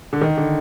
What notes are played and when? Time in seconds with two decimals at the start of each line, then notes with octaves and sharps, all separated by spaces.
0.13 D3
0.21 D#3
0.37 D3